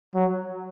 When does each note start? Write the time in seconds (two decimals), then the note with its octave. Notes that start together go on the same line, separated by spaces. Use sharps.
0.15 F#3